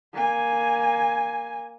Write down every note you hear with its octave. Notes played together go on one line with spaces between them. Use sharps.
A#3 G#5